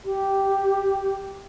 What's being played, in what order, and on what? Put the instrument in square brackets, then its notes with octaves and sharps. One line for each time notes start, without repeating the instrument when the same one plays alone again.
[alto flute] G4